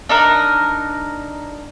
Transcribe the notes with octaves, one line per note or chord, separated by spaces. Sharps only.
D4 D#4 A#4